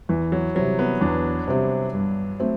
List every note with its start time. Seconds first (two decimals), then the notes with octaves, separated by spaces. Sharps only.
0.09 E2 E3
0.32 F#3
0.55 C3 F#3 G3 C4
0.79 B3
1.01 E2 D4
1.48 C3 G3 C4
1.94 G2
2.40 F#3 A3 C4